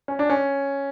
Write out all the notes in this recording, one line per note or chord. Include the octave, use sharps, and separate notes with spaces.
C#4
D4
C#4